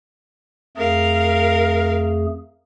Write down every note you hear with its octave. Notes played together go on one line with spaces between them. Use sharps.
F2 A3 G#4 A#4 F5